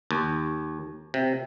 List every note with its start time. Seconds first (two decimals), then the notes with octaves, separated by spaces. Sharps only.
0.11 D#2
1.14 C3